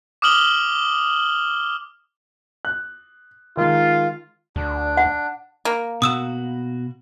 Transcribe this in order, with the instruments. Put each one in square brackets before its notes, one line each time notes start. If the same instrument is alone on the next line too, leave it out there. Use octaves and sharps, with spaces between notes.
[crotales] D6 D#6 F6 F#7 G7
[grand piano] F#6
[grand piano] D#3 G#3 [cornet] F4
[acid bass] D2 [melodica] D4
[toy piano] F#5
[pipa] A#3
[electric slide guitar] B2 F#4 [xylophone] D#6 E6 E7